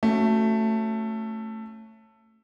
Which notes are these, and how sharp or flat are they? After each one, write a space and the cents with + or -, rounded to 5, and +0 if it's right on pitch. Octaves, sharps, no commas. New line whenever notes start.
A3 +10 C#4 -20 F#4 +0